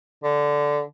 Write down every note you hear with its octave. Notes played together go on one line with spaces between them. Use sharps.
D3